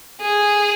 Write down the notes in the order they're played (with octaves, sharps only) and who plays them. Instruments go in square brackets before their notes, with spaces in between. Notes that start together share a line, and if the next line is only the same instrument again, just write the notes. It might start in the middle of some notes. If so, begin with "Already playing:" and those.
[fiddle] G#4